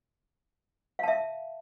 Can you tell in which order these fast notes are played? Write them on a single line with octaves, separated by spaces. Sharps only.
F5 A5 E5